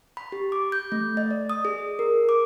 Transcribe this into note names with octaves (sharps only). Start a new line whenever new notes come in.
B5
G4
D6
G6
A3
D#5
D5
D#6
G#4
A#4
D6